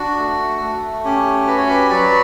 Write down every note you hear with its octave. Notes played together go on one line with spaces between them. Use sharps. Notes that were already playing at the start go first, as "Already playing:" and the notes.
Already playing: D4 F#4
A3
A3
C#4 G4
F#4 B4
C#5
G4 B4
F#3 B4 D5